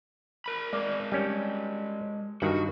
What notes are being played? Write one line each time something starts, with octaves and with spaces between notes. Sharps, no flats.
A#4 B5
G#3 A#4 D5
G3 C#4
G2 D#3 F#4